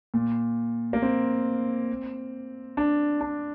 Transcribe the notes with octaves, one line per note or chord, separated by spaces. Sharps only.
A#2
A#3
C4
D4
D4